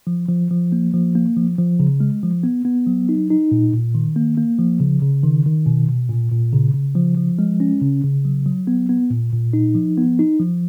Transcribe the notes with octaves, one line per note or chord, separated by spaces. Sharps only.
F3
F3
F3
A#3
F3
A#3
F3
F3
C#3
G#3
F3
B3
B3
F#3
D#4
D#4
A#2
A#2
D#3
A#3
A#3
F3
C#3
C#3
D#3
D#3
B2
B2
A#2
A#2
C#3
C#3
F3
F3
G#3
C#4
C#3
C#3
F#3
F#3
B3
B3
A#2
A#2
D#4
F3
B3
D#4
F3